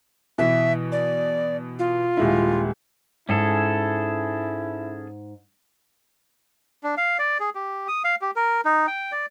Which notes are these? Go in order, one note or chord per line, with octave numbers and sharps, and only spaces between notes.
B2 E3 E5
D5
F4
D#1 G#3 E4
G#2 C#4 E4 G#4 A4
D4
F5
D5
G#4
G4
D#6
F5
G4
A#4
D#4
G5
D5